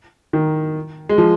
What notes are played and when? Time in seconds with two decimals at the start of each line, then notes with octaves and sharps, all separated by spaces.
0.33 D#3
1.09 G#3
1.18 F3